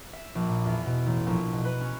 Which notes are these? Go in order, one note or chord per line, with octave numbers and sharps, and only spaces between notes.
E5
A#1
A#2
E2
B2
A1
A#1
B2
B4
C#4